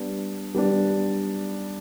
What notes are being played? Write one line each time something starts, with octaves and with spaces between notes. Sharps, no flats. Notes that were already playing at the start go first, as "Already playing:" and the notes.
Already playing: G3 B3 D4
G3 B3 D4